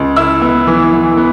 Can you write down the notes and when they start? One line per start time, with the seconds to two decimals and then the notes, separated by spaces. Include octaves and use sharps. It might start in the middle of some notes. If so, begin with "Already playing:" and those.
Already playing: C#2
0.16 E4 E6
0.41 B3
0.67 E3
0.93 E3
1.17 B3